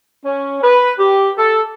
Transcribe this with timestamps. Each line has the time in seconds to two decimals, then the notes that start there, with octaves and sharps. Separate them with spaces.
0.24 C#4
0.63 B4
0.99 G4
1.38 A4